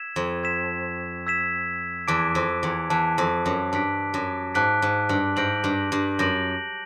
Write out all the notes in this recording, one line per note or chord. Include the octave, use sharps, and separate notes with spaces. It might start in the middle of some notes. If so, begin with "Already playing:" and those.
Already playing: E6 G#6 B6 E7
F2
E6 G#6 B6 E7
E6 G#6 B6 E7
E2 A5 D6 F#6 B6 D7
F2
E2
E2 A5 D6 F#6 B6 D7
F2
F#2
G2 A5 D6 F#6 B6 D7
F#2
G#2 A5 D6 F#6 B6 D7
G#2
G2
G#2 G6 A#6 D7 F#7
G2
G2
F#2 G6 A#6 D7 F#7